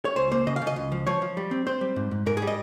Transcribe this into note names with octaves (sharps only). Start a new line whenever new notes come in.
C#5
C#2 C5
A#3 C5
C#3 D#5
F5
C#3
D#5
C#2
F3
F3 C#5
F3
G3
C4
C4 C5
G3
G#2
G#2
G#2 A#4
G#4
G3
D#5